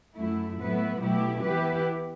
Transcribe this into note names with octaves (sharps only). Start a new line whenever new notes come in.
F#2 F#3 A3 E4
A2 F#3 B3 E4 B4
B2 F#3 A3 E4 G4
E3 B3 E4 G4 B4